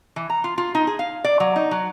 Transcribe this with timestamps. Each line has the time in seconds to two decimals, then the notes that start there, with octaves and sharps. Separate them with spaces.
0.16 E3
0.30 A#5
0.44 F4
0.58 F4
0.75 D#4
0.87 G#4
0.99 F5
1.24 D5
1.40 F#3
1.56 D#4
1.71 F#3